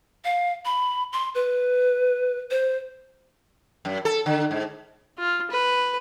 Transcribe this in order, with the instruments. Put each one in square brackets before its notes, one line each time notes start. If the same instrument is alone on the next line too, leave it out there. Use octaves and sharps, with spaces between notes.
[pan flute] F5
B5
C6
B4
C5
[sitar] F#2
A4
D3
G#2
[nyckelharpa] F4
B4